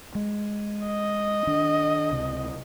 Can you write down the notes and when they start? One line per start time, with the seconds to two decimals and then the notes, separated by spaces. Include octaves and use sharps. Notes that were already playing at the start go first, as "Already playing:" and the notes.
0.15 G#3
0.86 D#5
1.47 D#3 D4
2.11 C#2 C3